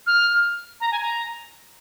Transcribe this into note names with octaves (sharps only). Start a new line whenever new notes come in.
F6
A#5
G#5
A#5